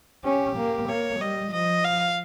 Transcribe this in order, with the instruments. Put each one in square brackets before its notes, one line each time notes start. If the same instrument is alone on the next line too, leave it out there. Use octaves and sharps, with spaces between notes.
[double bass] C#4 [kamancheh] G4
[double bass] A#3
[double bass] A#3 [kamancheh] C#5
[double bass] G3 [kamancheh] D#5
[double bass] F3 [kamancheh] D#5
[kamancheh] F5